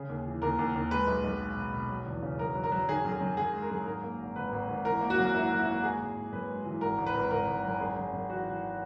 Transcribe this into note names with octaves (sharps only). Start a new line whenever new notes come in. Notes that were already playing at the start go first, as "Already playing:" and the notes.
Already playing: C#3 G#4
D#2
E3
D#2 A#4
D#2
D#2
G#3 B4
B1
B1
G#3
B2
B2
F#3
E2
C#3
F#3 A#4
F#3
A#4
F#3
D#3 G#4
F#2
G#4
F#2
F#2 G#4
G#3
A#4
F#2 G#4
G#2 A#4
A#3
G#1
G#1 B4
G#1
G#1
E3 A#4
A#3
F#4
F#2
A#3 E4
F#2
E4
A#3
G#3 G#4
G#1
G#1
F#2 B4
G#3
E3
G#1 A#4
G#1
B4
G#1
G#1 A#4
G#1
F#2
F#2 G#4
F#2
F#2
E3 F#4
E3